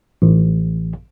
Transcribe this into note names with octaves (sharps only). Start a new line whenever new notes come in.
A1